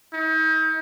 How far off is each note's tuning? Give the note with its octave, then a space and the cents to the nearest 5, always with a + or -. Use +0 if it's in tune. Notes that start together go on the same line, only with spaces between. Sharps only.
D#4 +40